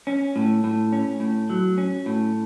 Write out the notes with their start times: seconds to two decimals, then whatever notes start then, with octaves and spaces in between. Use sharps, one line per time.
0.07 C#4
0.36 A2
0.64 A2
0.93 C#4
1.20 A2
1.50 F#3
1.78 C#4
2.06 A2